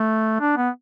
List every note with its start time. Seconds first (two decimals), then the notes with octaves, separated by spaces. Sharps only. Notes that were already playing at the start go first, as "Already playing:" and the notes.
Already playing: A3
0.41 D4
0.57 B3